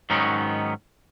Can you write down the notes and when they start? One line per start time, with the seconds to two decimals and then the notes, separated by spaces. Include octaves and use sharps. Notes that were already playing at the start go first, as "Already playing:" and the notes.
0.10 G#2 D#3 F#3 B3 C#4 D#4